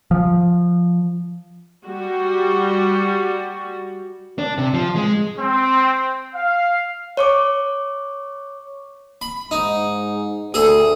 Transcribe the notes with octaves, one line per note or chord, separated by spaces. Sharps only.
F3
G3 F#4
D4
C3
F3
G#3
C4
F5
C#5 C#6 D6
B5
G#2 D#4
D2 G#4 A4